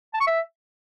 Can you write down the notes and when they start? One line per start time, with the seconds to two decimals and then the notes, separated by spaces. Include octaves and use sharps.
0.14 A5
0.20 C#6
0.27 E5